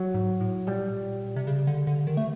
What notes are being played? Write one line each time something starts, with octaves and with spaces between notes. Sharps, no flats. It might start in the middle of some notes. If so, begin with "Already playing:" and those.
Already playing: F#3
G#2
A2
A#2 G3
C3
C#3
D3
D3
D#3
A3